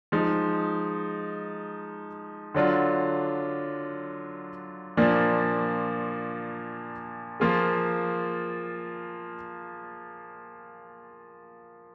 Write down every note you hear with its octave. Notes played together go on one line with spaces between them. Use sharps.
F3 G#3 D#4
D3 F#3 D4 F4
A#2 F3 A#3 D4
F3 A#3 F4 G#4